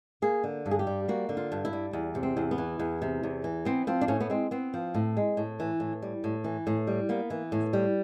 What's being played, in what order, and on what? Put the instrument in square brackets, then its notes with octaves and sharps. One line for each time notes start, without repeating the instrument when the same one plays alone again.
[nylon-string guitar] A#3 G#4
D3
G2
G#4
G4
G3
A#3 F#4
D3
F4
G2
E4
G3
E2
C3
C4
E2
B3
E3
E2
C3
E2
E3
B3 C4
F3 C4
D4
A2 C#4
B3
G#3 C4
B3 C4
F3
A2
G#3
A2
E3
A2
G3
A2
E3
A2
G3
A#3 B3
E3
A2
G3